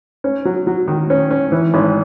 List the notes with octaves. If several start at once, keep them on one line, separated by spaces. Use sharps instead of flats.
C#4
F#3
F#3
D#3
C#4
C#4
E3
G#1